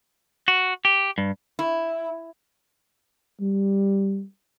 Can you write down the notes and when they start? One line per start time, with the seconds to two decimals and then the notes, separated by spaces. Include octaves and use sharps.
0.48 F#4
0.85 G4
1.18 G2
1.59 E4
3.40 G3